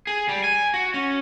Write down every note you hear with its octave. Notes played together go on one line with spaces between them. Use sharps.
G#4
G3
G#5
F#4
C#4